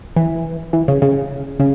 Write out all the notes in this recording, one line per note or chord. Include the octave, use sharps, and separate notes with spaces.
E3
E3
C#3
C#3
C#3